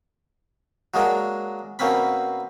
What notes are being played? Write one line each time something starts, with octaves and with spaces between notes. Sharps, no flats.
F#3 G#3 A#3 D4
B2 A#3 C4 C#4 B5